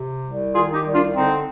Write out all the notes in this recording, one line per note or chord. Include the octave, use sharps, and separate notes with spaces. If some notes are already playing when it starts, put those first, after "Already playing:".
Already playing: C3
C2
D#3 F4 G#4
D#4 G4
C2
D4 F4
D3 C4 D#4